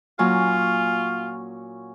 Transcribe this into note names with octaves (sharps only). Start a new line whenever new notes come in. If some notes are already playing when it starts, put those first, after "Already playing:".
A#2 F#3 C#4 F4